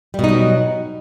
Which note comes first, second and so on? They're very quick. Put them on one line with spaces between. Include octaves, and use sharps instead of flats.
G3 B2 D#4 F#3